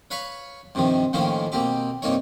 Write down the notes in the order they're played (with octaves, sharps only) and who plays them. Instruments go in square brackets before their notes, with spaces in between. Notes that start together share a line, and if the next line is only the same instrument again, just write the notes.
[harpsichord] B4 C#5 F5 B5 C#6
G2 C3 D#3 F3
A2 D#3 F3 A#3 C#4 F4
B2 A#3 C4 G4
G2 C3 A#3 D#4 C#5